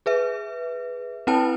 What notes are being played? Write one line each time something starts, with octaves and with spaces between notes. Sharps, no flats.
G#4 B4 E5
C4 E4 B4 G5 A5